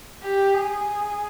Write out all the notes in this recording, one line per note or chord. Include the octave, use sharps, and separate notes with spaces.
G4
G#4